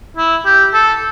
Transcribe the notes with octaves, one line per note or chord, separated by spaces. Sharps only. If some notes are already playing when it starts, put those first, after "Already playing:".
E4
G4
A4